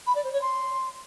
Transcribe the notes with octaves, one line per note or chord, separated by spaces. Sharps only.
B5
D5
C5
C#5
C6